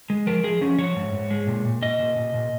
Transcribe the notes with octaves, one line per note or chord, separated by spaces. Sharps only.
G#3
F3 A#4
F3 G#4
F3 C#4
F3 C#5
G#2
G#2
G#3
A#2
A#2
A#2 D#5
A#2
A#2
A#2